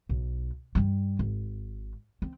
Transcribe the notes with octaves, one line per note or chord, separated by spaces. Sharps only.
B1
G2 G3
G#1
C4